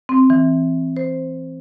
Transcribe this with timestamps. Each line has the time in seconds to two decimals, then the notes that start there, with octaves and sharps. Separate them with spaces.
0.09 C4
0.30 E3
0.97 C5